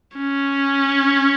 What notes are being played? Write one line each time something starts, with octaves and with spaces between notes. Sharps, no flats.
C#4